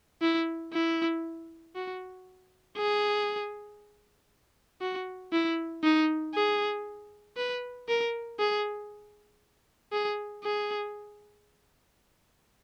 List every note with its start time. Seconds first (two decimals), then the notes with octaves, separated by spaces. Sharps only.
0.22 E4
0.73 E4
1.75 F#4
2.77 G#4
4.81 F#4
5.32 E4
5.83 D#4
6.34 G#4
7.37 B4
7.88 A#4
8.39 G#4
9.92 G#4
10.44 G#4